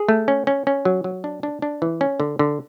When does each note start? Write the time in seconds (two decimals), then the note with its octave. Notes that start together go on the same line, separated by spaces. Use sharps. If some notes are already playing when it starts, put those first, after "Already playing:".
Already playing: G#4
0.09 A3
0.28 C#4
0.47 C#4
0.67 C#4
0.85 F#3
1.04 F#3
1.24 D4
1.43 D4
1.62 D4
1.82 E3
2.01 C#4
2.20 D3
2.39 D3